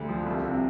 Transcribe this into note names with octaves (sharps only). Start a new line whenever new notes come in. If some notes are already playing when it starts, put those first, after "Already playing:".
Already playing: D2 D3 G3
F3
C2
C3